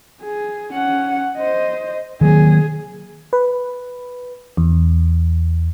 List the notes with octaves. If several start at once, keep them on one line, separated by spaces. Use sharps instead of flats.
G#4
C#4 F#5
C5 D#5
D#3 F#3 A#3 G#4
B4
E2